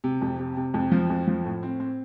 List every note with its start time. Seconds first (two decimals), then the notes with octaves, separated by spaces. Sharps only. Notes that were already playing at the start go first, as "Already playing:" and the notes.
0.04 C3
0.22 F2
0.39 C3
0.57 C3
0.74 F2
0.92 F3
1.10 F2
1.27 F3
1.45 A2
1.63 C4
1.80 C4